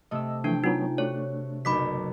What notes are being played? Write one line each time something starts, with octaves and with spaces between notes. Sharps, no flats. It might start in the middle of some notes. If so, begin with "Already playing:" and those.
C3 A3 D#5 E6
E3 F3 A3 D4 G5
F#3 B3 D#4 F4 C#5
A3 D4 F#4 C#5
F#1 B1 B5 D6 B6